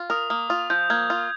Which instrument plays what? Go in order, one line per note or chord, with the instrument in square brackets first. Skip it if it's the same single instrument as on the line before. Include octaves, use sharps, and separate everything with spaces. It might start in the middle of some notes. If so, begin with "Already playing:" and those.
Already playing: [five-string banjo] F4
[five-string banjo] A#4 [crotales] D#6
[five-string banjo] A#3 [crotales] D#6
[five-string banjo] F4 [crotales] D#6
[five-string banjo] F3 [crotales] G6
[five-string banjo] A#3 [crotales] G#6
[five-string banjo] F4